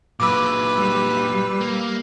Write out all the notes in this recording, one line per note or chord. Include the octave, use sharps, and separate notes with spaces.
A#2 F#3 B4 D6 E6
G3
A#3